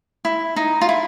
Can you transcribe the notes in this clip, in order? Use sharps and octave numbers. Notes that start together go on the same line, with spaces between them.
E4
D#4
F4
E4